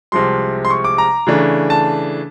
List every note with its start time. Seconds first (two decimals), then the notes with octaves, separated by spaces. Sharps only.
0.12 C2 C3 F3 G#3 C6
0.65 C6
0.70 C#6
0.84 D6
0.98 A#5
1.27 C#3 E3 A3 D4
1.70 A5